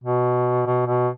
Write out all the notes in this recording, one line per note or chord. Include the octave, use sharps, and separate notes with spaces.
B2
B2
B2